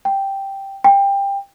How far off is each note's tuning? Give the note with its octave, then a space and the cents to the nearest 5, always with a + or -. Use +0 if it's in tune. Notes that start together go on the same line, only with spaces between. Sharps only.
G5 +0
G5 +20